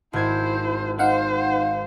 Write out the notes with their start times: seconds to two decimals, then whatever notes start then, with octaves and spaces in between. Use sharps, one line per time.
0.13 G#1 E4 C5 G#6
0.99 D#4 C5 F5 F#5